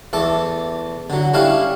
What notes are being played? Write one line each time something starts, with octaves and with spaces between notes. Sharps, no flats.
E2 A3 A4 D6
D3 F#3
G3 A3 C#4 D4 E4 F5